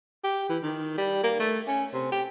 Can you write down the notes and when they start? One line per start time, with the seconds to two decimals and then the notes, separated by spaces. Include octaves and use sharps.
0.24 G4
0.50 E3
0.62 D#3
0.98 G3
1.24 A#3
1.40 A3
1.67 C#4
1.93 C3
2.12 G4